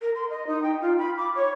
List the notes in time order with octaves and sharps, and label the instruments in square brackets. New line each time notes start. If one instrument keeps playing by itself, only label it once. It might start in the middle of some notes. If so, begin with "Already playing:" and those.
[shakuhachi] A#4
C6
D#5
D#4
G5
F4
B5
D6
C#5